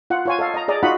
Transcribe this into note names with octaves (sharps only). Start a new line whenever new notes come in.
F4 F#5
F4 C#5 G#5
A4 D#5 F5
D#5 A#5
G#4 D5 D#5 A#5
D#4 F4 F#4 D#5 F#5 B5